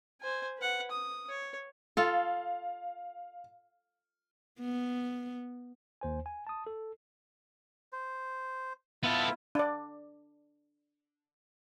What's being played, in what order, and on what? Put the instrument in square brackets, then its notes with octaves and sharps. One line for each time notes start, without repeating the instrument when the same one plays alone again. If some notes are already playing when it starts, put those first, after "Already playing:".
[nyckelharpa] C5 G#5
B4 F#5
D#6
C#5
[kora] F4 A4 [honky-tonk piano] F5
[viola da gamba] B3
[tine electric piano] D#2 C5 G#5
G#5
A5 D#6
A4
[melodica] C5
[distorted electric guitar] B3 A4 [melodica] E4 F4
[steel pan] D4 D5